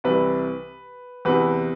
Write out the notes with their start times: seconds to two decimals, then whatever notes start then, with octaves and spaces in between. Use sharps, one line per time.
0.04 C2 C3 E3 B4
1.25 E2 C3 E3 B4